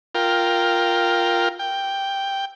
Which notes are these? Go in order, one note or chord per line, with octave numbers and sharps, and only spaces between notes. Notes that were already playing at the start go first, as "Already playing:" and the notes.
F4 A#4 G5
G5